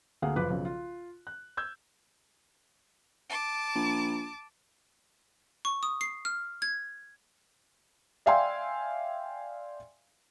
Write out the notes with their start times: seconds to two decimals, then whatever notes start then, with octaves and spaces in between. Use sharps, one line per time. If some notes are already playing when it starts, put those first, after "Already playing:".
0.22 D2 A#3 G#4 F5 F#5
0.36 F#1 F3 B4 D6 F#6
0.50 B1 C#3 F3
0.65 F4
1.27 F#6
1.57 E6 G6 G#6
3.29 A5 D6
3.75 A#1
5.65 C#6
5.83 D#6
6.01 C7
6.25 F6
6.62 G#6
8.26 D5 E5 F5 G5 G#5 C6